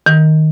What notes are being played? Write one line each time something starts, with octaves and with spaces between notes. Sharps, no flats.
D#3